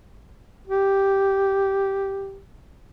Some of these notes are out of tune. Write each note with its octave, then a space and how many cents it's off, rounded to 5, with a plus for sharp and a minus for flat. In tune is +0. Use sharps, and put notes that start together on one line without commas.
G4 -5